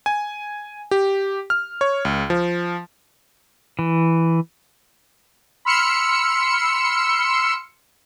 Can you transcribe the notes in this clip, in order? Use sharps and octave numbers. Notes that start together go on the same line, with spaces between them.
G#5
G4
F6
C#5
C#2
F3
E3
B5 C6 E6 F6 C#7